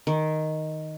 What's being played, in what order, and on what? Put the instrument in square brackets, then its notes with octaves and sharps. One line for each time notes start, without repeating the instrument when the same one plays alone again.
[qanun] D#3